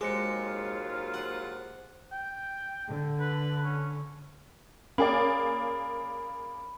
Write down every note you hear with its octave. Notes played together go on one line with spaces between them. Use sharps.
D#2 G#2 F#3 G#3 F4 G#4 C5 C#7
F#5
G5
D3
B4
C#4
A#3 C#4 G#4 D5 B5